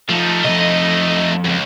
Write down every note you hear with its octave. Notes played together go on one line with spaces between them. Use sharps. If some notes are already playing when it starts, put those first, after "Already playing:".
F3 A3 D#4
C2 F2 D#5
C#2 F#2